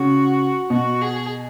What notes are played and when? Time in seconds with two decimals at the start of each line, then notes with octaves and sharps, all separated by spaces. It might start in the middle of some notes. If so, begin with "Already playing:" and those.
Already playing: C#3 F#4
0.70 B2 F#4
1.01 G#4